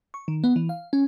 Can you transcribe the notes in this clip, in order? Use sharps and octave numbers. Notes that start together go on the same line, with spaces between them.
C#6
D#3
B3
E3
F5
C#4